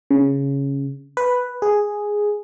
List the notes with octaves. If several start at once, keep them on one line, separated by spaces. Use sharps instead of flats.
C#3
B4
G#4